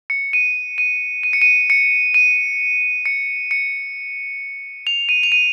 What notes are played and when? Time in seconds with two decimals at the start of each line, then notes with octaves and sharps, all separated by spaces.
0.10 C#7
0.33 D#7
0.78 D#7
1.23 D#7
1.33 C#7
1.42 D#7
1.70 C#7
2.14 D#7
3.06 C#7
3.51 C#7
4.87 F7
5.09 D#7
5.23 F7
5.32 D#7